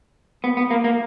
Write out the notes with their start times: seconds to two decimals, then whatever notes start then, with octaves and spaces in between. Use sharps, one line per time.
0.44 B3
0.57 B3
0.71 A#3
0.84 A#3